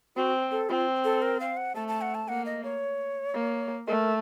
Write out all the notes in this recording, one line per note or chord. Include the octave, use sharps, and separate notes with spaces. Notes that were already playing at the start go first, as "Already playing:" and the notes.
C4 F#4
A4
C4 F4
A4
A#4
F5
F#5
A3 A5
A5
F#5
A5
A#3 F#5
D#5
C#5
A#3
A3 A#4